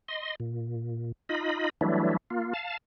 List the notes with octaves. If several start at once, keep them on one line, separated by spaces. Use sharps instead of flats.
D#5 C6
A#2
D#4 F4 D#5 B5
E3 F#3 G3 A3 D4 E4
A#3 F4
F5 A5